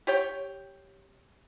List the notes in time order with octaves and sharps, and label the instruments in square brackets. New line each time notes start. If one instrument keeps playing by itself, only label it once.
[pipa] G4 C#5 G5